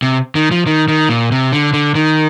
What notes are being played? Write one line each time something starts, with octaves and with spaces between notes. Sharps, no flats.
C3
D#3
F3
D#3
D#3
A#2
C3
D3
D3
D#3